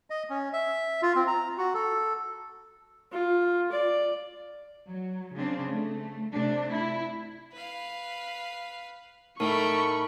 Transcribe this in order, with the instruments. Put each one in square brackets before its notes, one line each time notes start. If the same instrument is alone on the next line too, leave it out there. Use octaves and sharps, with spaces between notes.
[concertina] D#5
C#4
E5
F4
C4
A#5
F#4
A4
[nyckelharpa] F4
D5
[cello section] F#3
C#3 C4 D4
A3
C3 A3 D4
E4
[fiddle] B4 F5
[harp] A2 [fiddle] A3 G5 [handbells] D#4 A#4 [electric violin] B5 C#6